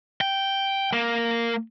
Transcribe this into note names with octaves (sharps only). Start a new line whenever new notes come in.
G5
A#3